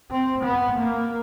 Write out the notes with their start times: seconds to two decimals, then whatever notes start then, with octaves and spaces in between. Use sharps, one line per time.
0.11 C4
0.45 B3
0.78 A#3